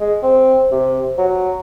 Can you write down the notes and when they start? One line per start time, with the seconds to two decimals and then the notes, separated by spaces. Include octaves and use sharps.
0.01 G#3
0.23 C4
0.71 C3
1.18 F#3